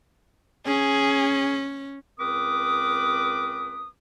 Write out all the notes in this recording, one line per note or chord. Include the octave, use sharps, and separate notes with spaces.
C#4 G#4
C#2 C4 A#4 B4 D6 D#6